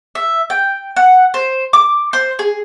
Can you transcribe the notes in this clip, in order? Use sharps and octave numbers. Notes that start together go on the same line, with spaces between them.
E5
G5
F#5
C5
D6
C5
G#4